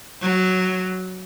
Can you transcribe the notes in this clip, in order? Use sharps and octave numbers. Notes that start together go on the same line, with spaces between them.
F#3